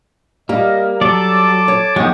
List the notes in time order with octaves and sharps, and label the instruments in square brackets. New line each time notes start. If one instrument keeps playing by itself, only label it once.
[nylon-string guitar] G3 G4 [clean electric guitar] A#3 [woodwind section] A#4 D#5
[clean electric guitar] F#3 [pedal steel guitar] A4 D5 [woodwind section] A5 D6
[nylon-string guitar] C#5
[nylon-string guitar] D#2 [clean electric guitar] F#3 F#4 G4 [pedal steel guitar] G#3 D#4 [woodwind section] B3